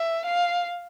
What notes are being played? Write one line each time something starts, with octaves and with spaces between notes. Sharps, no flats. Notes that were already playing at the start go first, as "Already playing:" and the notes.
Already playing: E5
F5